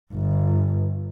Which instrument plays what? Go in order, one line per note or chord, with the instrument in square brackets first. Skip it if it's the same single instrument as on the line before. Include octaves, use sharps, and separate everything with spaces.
[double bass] G1